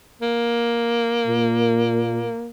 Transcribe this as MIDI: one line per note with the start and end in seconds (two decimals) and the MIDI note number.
0.22 2.50 58
1.27 2.28 46